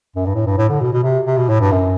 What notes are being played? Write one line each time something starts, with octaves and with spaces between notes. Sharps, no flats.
F#2
G2
A2
G2
A2
D3
B2
B2
C3
C3
B2
A2
G2
F#2